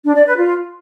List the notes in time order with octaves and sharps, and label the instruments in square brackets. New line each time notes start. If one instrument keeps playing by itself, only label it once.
[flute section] D4
D5
B4
F4